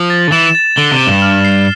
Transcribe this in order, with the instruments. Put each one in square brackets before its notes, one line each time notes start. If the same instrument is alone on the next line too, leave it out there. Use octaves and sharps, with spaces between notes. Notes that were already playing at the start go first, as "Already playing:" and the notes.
Already playing: [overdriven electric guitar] F3
[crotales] A6
[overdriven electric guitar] D3
[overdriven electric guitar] E3 [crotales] E7
[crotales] A6
[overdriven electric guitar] D3 [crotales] G7
[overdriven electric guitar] C3
[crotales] E7
[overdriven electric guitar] G2
[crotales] F6
C7